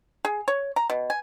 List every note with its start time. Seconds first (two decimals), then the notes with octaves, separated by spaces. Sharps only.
0.25 G#4
0.48 C#5
0.76 A#5
0.90 B2
1.10 G#5